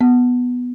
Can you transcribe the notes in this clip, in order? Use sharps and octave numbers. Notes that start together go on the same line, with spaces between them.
B3